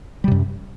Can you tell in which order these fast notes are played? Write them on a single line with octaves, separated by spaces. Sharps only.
G3 C3 F#2